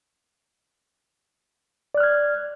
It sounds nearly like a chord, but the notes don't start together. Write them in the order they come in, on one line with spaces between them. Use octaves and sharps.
D5 F#6 F6 G#6